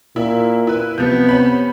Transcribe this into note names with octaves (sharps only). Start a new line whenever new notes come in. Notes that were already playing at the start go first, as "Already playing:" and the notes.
A#2 E4
E4 B4
C3 F3 B3 G6
C#4 B5